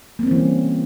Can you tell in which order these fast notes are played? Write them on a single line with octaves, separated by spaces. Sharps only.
A#3 C4 C#4 E3 G3